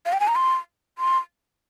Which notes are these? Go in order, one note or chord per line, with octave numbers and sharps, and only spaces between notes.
F5
G5
G#5
A#5
C6
C6